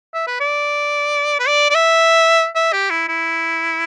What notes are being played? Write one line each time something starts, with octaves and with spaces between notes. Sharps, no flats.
E5
B4
D5
B4
D5
D5
E5
E5
G4
E4
E4